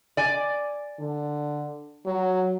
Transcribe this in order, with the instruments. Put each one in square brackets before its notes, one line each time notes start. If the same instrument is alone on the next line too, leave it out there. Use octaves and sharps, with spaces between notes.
[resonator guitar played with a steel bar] D5 G#5
[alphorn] D3
F#3